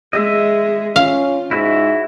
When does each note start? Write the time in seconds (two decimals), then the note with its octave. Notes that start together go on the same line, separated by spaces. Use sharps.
0.13 G#3 G#4 D#5 E5
0.96 C#4 F4 F5
1.51 G#2 E4 F#4 E5